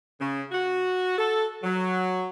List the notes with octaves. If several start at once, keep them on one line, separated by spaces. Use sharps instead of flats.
C#3
F#4
A4
F#3